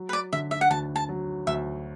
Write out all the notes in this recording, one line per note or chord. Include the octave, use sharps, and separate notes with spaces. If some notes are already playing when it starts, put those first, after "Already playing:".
Already playing: F#3
B4
D5
D3 E5
E5
F#5
D2 A5
A5
F#3
D2 E5